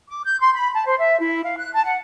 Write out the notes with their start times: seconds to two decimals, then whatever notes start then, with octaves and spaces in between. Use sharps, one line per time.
0.08 D6
0.24 G6
0.40 C6
0.54 B5
0.74 A5
0.86 C5
0.98 E5
1.20 E4
1.44 F5
1.58 F#6
1.74 A5
1.85 F#5